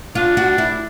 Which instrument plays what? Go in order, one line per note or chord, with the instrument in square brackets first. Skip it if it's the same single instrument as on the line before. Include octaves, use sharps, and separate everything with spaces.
[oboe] D4 [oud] F4
[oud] F#4
E4